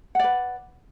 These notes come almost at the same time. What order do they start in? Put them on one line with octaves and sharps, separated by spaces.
F#5 D5 B4